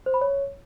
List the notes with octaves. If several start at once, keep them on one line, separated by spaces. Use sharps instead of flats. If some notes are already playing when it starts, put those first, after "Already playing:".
C5
B5
C#5